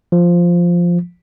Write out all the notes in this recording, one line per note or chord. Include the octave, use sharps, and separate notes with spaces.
F3